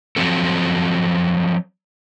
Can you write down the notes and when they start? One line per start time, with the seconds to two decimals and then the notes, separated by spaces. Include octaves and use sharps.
0.16 F3 F#3 C4 A4